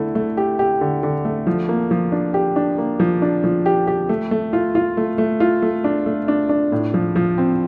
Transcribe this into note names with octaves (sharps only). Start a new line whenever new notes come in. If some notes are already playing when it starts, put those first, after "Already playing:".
Already playing: D3 A3 E4
A3
G4
G4
D3
D3
A3
F3
A#3
F3
D4
G4
D4
A#3
F3
D4
F3
G4
G4
A3
A3
F4
F4
A3
A3
F4
A3
D4
A3
D4
D4
A2
F3
F3
C4